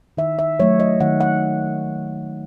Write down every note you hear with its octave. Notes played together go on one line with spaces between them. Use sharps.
D#3 E5
E5
F#3 A3 C#5
D#5
D#3 F#5
F#5